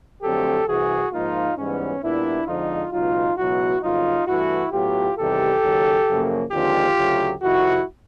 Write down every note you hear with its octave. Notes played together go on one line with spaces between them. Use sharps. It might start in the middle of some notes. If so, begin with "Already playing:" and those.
F2 D3 F#3 A3 C4 G4 A4
C2 C3 E3 F#4 G#4
G#2 F3 A#3 D#4 F4
G#2 E3 G3 B3 C#4
A#2 G3 B3 D4 E4
F2 D3 F3 G#3 D#4 F4
C#2 B2 F#3 D#4 F4
C#2 B2 F#3 B3 E4 F#4
F2 C#3 F#3 A#3 D#4 F4
G2 E3 A3 E4 F#4
A2 F#3 B3 F4 G4
E2 C3 D#3 G3 G4 A4
D#2 C#3 F#3
F#2 C#3 F3 A#3
D#2 D3 F3 G#3 C4 F4 G4
D2 C#3 F#3 A3
F2 C3 D#3 E4 F#4